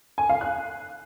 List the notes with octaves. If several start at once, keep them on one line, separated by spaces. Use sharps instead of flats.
G#5
F5
F#6